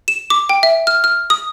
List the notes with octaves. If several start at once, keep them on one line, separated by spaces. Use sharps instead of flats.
E7
D6
G5
E5
F6
F6
D#6